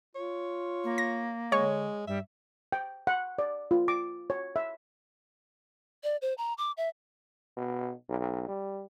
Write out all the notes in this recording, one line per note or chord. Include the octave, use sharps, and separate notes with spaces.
F4 C#5
A#3
A#6
D3 G#3 C#5 C#6
G2 G3 E5
G5
F#5
D5
F4
D6
C#5
E5
D5
C5
A#5
D6
E5
B2
B1
G3